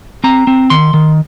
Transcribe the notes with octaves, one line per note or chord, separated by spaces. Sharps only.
C4 A#5
C4
D#3 C6
D#3